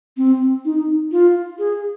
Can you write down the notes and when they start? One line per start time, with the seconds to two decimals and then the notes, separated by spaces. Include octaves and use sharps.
0.17 C4
0.65 D#4
1.11 F4
1.59 G#4